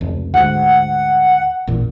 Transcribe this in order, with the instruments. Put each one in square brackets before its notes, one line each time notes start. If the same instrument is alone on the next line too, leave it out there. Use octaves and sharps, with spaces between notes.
[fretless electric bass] F1 C#2
[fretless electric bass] D2 G#2 [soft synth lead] F#5
[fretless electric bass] A1 E2 A#2